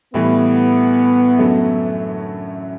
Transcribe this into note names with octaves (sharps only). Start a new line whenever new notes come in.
A2 E3 G3 B3
F#2 D3 F#3 A3